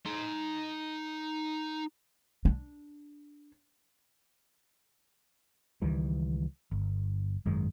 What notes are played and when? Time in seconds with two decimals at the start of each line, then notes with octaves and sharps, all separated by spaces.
0.06 D#4 C6
2.45 D4
5.82 C#2 D#3 E3 G3
6.71 G1
7.46 G#1 F#2 D#3 G#3